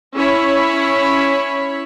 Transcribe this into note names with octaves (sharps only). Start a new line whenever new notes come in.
C#4 E4 C#5 B5